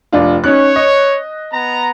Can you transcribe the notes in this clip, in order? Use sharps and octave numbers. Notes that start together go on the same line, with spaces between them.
F1 D4 F4
C#4 D#4 C#5 F#6
D#5
B3 A#5